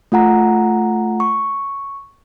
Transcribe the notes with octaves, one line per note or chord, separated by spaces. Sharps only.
A3 F4 F#5 A#5
C#6